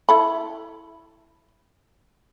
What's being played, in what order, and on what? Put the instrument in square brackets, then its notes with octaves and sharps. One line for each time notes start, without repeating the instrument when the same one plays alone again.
[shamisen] E4 A4 B5